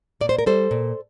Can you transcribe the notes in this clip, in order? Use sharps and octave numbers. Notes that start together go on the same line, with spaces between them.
A#2 D5
C5
A#4
G3 A4 C5
A#2